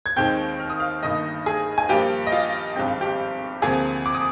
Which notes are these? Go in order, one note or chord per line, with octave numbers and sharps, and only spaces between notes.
G#6
D#2 D#3 G#3 C4 G5 G6
F6
D#6
F5 F6
G1 G2 D#3 A#3 D#5 D#6
G#4 G#5
G#5
G2 F3 A#3 G4 G5
D#5
F4 F5
G#1 G2 F3 G#3 C4 G5
F5
G4 G5
D2 C3 F3 A#3 G#4 G#5
D6
D#6